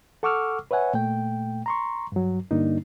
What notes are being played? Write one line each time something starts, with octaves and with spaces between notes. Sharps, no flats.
A4 F#5 C#6 D6 E6 F6
B4 C#5 E5 F#5 G#5
A#2 A3 G5
A#5 C6 C#6
G2 F#3
G2 D3 G3 A#3 D4 D#4